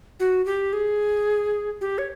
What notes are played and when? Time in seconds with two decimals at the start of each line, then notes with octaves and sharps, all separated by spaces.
0.20 F#4
0.46 G4
0.73 G#4
1.81 G4
1.98 C#5